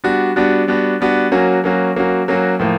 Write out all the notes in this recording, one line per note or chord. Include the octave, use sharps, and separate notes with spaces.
G3 B3 D4 F#4
G3 B3 D4 F#4
G3 B3 D4 F#4
G3 B3 D4 F#4
F#3 A#3 C#4 F#4
F#3 A#3 C#4 F#4
F#3 A#3 C#4 F#4
F#3 A#3 C#4 F#4
A2 F3 A#3